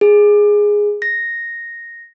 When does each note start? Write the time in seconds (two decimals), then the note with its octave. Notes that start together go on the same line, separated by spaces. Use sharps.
0.01 G#4
1.02 A#6